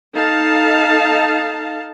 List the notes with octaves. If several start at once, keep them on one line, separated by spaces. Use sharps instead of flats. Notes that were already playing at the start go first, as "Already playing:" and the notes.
D#4 A4 F5 A5